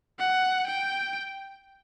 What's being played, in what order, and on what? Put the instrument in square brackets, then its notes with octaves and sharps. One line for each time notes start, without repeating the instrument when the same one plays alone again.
[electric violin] F#5
G5